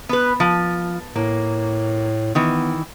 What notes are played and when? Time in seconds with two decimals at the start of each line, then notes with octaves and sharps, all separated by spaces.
0.09 B3 B4
0.40 F3
1.16 A2 A#3
2.35 D#3 E3 B3